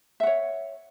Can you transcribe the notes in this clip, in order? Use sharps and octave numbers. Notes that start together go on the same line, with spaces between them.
C#5 E5 F#5